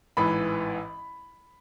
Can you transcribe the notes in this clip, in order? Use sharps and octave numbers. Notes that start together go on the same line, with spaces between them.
A1 G#2 E3 B5